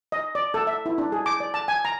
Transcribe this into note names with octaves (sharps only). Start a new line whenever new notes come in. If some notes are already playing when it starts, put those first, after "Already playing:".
D#5
D5
A4
E5
E4
D4
G#4
D6
D5
A5
G#5
A#5